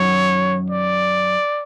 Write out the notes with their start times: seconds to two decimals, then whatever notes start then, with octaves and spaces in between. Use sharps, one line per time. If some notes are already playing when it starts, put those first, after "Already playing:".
Already playing: F#2 D#3 F#3 C#5
0.70 D5